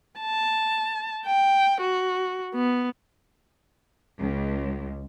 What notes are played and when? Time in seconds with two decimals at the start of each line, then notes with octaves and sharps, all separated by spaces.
0.20 A5
1.26 G5
1.81 F#4
2.54 B3
4.19 C#2